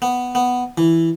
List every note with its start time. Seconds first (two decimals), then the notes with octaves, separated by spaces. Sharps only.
0.02 B3
0.35 B3
0.78 E3